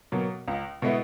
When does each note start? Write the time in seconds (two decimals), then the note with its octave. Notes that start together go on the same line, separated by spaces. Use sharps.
0.12 B2 F#3 A#3
0.48 C#2
0.82 B2 G#3 B3 E4